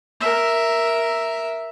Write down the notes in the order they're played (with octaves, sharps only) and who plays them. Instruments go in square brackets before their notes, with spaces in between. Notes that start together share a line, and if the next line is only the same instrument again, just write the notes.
[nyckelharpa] A#4 E5